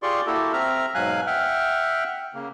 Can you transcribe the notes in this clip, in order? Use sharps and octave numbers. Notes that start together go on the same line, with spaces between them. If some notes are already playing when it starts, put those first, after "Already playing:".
F4 G4 G#4 D5 C6 C#6
A#3 E4 F#4 G4 A4
C4 E5 A#5 F6
G#2 B2 F#3 F5 G#5 F#6
E5 F#5 G5 F6
C#3 A#3